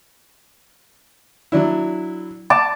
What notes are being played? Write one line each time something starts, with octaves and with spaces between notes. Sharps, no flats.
F#3 D4 E4
A5 D6